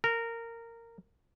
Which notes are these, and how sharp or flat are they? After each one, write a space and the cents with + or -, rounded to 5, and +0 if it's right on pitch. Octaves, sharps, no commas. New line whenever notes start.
A#4 -15